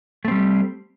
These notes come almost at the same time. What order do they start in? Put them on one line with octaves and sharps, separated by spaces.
A3 C4 G3